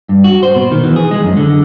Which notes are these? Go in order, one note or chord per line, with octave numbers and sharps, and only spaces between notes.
G2
F#4
C5
B2
D#3
E3
G#4
G#3
F#2
D3